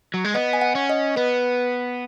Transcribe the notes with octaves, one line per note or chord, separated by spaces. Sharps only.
F#3
G#3
B3 D#5
G#5
F#5
C#4
D#5
B3 B4